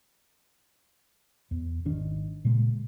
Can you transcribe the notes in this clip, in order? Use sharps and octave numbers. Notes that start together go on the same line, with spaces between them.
E2
G#1 D#3 D4
A#2 C#3 G#3 A#3